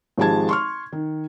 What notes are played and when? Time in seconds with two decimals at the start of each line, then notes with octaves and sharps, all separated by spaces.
0.18 G#1 F3 G#3 G4 A5 G#6
0.49 C6 C#6 F6
0.93 D#3